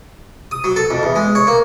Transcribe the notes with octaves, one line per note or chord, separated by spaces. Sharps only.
D#6
F#3
A4
F2
E2
G#3
C#5
A#3